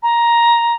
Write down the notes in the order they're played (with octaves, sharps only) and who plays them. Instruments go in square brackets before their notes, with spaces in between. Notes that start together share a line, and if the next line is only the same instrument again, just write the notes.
[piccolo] A#5